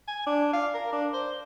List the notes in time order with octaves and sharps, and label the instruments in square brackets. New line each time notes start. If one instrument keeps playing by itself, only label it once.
[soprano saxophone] G#5
D4
F5
A#4
D4
C5